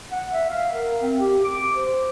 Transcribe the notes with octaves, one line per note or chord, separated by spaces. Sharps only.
F#5
E5
F5
A#4
C4
G4
D6
C5